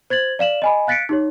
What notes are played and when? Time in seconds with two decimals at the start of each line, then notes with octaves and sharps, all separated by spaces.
0.10 C5 G#6 A6 F#7
0.39 D5 F5 E7 F#7
0.62 D#5 G#5 B5
0.87 F5 F#6 A6 B6 C#7 D7
1.09 D#4 G4 C#5